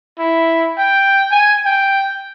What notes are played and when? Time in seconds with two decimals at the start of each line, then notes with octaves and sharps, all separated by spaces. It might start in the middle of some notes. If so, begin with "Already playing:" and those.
0.19 E4
0.78 G5
1.31 G#5
1.66 G5